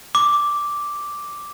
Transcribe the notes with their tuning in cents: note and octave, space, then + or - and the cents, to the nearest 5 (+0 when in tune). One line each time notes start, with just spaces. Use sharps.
D6 -5